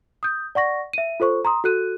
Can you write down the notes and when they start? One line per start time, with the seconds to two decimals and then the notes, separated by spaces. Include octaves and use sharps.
0.23 D#6 G6
0.55 D5 F#5 C#6 A#6
0.93 E5 D#7
1.20 F4 A4 C5 C#6
1.45 A#5 C6 D#6
1.64 F#4 A4 F#6 D#7